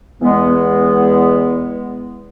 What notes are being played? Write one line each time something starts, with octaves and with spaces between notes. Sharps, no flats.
E2 G#3 B3